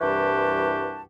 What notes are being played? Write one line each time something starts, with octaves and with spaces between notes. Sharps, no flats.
C2 G2 E3 F#4 G4 A5